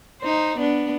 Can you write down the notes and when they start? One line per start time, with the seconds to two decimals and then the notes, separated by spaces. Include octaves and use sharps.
0.21 D#4 C5
0.57 B3 D4